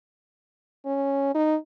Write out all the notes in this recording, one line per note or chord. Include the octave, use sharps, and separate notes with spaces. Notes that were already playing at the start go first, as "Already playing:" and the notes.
C#4
D#4